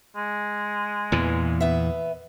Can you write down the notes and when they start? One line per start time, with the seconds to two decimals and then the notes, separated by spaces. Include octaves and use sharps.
0.16 G#3
1.12 E2 A#2 E3
1.60 B3 E5